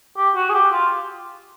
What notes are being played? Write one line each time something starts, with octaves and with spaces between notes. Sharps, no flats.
G4
F#4
G#4
G4
F4